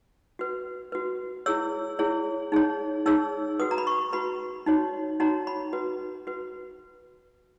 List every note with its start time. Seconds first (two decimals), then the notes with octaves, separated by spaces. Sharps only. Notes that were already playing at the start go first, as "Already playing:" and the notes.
0.39 F#4 B4
0.92 F#4 B4
1.46 E4 G#4 C#5 E6
1.99 E4 G#4 C#5
2.52 D#4 G#4 C#5
3.06 D#4 G#4 C#5 E6
3.59 F#4 B4 D#6
3.71 A#5
3.78 B5
3.87 C#6
4.13 F#4 B4 B5
4.66 D#4 F#4 C#5
5.20 D#4 F#4 C#5 A#5
5.47 B5
5.73 F#4 B4
6.27 F#4 B4